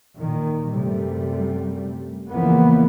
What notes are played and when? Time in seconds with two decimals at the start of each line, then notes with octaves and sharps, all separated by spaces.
0.17 A#2 D#3
0.70 F#2 C3 G3 A3
2.29 E2 C#3 E3 F3 A#3 B3